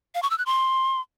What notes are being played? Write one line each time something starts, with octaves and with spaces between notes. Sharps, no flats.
F5
C#6
E6
F#6
C6